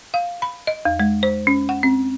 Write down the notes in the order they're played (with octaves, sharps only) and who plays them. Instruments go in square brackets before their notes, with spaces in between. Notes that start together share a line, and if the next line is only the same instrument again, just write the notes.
[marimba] F5
B5
D#5
E2
G#3
C5
C#4
F#5
C4